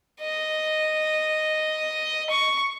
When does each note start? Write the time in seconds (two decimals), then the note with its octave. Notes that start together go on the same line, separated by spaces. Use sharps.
0.21 D#5
2.30 C#6